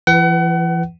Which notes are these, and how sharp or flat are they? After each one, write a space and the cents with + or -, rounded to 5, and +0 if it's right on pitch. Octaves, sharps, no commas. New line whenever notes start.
E3 +35 B4 +0 F#5 +35